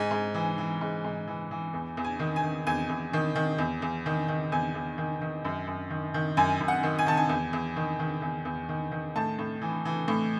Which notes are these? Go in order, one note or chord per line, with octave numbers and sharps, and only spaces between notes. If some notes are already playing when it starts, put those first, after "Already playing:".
Already playing: G#2 G#5
G#2
E3
E3
G#2
G#2
E3
E3
E2
E2
G#5
D#3
G#5
D#3
E2 G#5
E2
D#3
D#3
E2
E2
D#3
D#3
E2 G#5
E2
D#3
D#3
F#2
F#2
D#3
D#3
F#2 G#5
F#2
F#5
D#3
G#5
D#3 A5
G#5
E2
E2
D#3
D#3
E2
E2
D#3
D#3
A2 A5
A2
E3
E3
A2